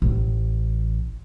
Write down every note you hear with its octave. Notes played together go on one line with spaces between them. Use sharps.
A1